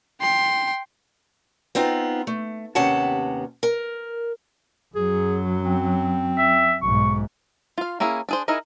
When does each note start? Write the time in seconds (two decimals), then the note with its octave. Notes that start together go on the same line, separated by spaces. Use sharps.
0.21 G5 C6
1.75 B3 C4 D#4 F4
2.27 A3
2.75 D#2 C3 B3 C#4 F#5 A5
3.63 A#4
4.95 F#2 F#3 G#4
5.64 C4
6.37 E5
6.82 B1 G#2 C#6
7.78 F4 F5
8.00 A#3 C#4 E4 G#4
8.29 D4 G#4 C5
8.48 D#4 E4 G#4 A#4 D#5